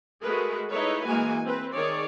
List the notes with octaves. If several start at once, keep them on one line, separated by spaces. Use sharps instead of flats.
G#3 A3 F#4 G#4 A#4 B4
D#4 E4 G#4 A4 B4 C#5
E3 G#3 A#3 F#4 G#5
C4 B4
D#3 G#4 C#5 D5